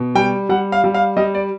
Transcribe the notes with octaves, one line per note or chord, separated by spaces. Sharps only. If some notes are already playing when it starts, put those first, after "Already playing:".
Already playing: B2
G3 G5
G3 F#5
F5
G3
F5
G3 D#5
D5